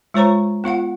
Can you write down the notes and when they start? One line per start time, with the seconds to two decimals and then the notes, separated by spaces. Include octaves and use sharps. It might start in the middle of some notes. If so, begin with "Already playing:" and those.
0.14 G#3 F4 C5 C#5 A#5 C#6
0.64 B3 F4 F5 F#5